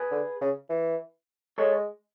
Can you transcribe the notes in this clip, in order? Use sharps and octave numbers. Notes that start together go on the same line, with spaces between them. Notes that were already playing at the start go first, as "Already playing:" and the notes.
Already playing: G#4 B4
D3
C#3
E3
G#3 A4 C#5